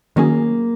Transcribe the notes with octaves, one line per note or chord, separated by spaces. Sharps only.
D#3 F#3 A#3 C#4 G#4